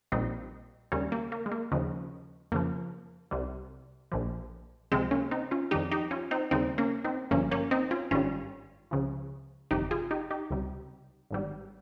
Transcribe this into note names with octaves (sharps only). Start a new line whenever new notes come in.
A#1 A#2 G3 C4 D#4
D#2 C#3 G3 A#3 C#4
A#3
A#3
G#3
A#3
D#2 C#3 F3 G#3
F2 C#3 F3 A#3
C2 C3 G3
A#1 A#2 F3
C#2 C3 F3 G#3 C4
A#3 C#4
C4 D#4
C#4 F4
F2 D#3 G3 D#4 G4
D#4 G4
C#4 F4
C4 D#4
D#2 C#3 G3 C4 D#4
A#3 C#4
C4 D#4
G1 G2 F3 A#3 C#4
A#3 C#4
C4 D#4
C#4 F4
G#1 G2 D#3 G3 C#4 F4
C#2 C#3 F3
G1 F2 C3 D#4 G4
F4 G#4
D#4 G4
D#4 G4
C#2 C3 G3
G#1 G#2 G3